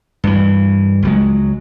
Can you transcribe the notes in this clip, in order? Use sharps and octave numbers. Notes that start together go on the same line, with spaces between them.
G2 E3
C#2 F#3 G#3